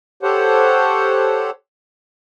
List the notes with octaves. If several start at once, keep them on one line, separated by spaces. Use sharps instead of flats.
G4 A4 C5 C#5 F#5